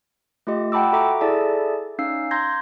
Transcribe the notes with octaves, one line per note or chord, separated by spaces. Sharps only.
A3 F4 G4 D#5
F#5 G5 A5 B5 D6 E6
F#4 A4 E5 A#5 D6
E4 G#4 A4 D5 E5 A5
C#4 D#4 F5 E6 C7
A#5 C6 G6 G#6 A#6